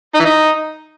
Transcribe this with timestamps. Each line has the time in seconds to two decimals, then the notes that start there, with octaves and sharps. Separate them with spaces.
0.15 D#4
0.20 E3
0.25 D#4